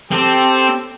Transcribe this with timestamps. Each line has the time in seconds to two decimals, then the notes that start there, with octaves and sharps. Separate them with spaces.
0.12 C4 G4 A4